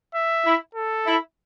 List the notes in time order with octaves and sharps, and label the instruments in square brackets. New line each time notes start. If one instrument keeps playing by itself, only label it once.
[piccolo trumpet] E5
[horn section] E4
[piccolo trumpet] A4
[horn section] E4